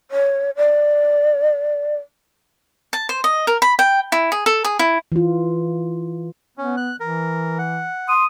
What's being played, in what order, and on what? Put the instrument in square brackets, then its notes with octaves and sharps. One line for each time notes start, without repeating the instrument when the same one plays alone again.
[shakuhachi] C#5
D5
[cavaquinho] A5
C5
D#5
A#4
B5
G5
E4
G#4
A4
G#4
E4
[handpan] E3 F4
[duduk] B3 [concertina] C#4
[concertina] F#6
[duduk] E3 [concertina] A#4
[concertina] F#5
[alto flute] C6 [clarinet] D#6